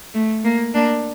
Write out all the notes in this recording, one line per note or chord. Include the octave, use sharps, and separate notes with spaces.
A3
A#3
A#3 D4